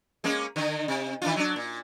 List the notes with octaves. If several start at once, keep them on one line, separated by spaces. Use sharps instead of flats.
G#3 A#3 C#4
D3 D#3
C3
D#3 D4 F4
F#3 D4
A#2